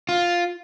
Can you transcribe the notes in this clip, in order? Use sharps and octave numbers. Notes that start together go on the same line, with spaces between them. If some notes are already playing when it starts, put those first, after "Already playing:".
F4